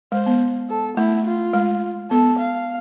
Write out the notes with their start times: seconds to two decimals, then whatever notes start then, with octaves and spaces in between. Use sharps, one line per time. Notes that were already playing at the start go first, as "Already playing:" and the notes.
0.12 G#3 C5
0.26 B3
0.70 A4
0.97 A3 E4
1.26 F4
1.53 G#3
2.10 B3 A4
2.39 F5